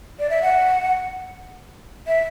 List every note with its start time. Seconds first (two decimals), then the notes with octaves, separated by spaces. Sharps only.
0.19 D5
0.30 E5
0.42 F#5
2.07 E5